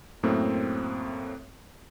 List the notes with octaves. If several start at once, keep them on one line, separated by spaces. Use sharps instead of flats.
F#2 A2 A3 A#3 C4